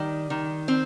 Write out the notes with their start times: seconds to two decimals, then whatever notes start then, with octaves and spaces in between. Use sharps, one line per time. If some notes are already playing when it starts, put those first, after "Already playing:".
Already playing: D#3 G3
0.30 D#3
0.68 C4